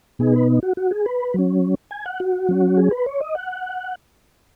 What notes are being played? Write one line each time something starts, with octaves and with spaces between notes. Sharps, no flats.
B2 B3 D#4 G#4
B4
F#4
F#4
G#4
B4
F#3 C#4
G#5
F#5
F#4
F#3 C#4
G#4
B4
C#5
D#5
F#5